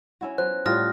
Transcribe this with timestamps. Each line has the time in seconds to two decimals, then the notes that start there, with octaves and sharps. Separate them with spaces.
0.21 C#4 E4 F#4
0.38 F#3 B3 C5 F#6
0.66 A2 G3 F4 D#6 F6 A#6